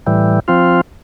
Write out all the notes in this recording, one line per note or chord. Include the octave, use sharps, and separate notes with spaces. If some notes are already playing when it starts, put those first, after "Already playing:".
A2 E3 G3
F3 C4 F4